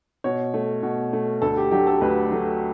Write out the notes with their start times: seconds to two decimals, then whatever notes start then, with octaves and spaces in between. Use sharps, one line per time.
0.24 B2 C#5
0.54 A3
0.83 B2
1.13 A3
1.42 D2 A4
1.57 G4
1.71 D3 F#3 A3 G4
1.87 A4
2.01 D2 B4
2.31 D3 F#3 A3